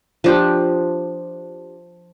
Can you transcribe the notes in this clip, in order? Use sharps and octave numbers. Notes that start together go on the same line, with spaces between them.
F3 D4 G4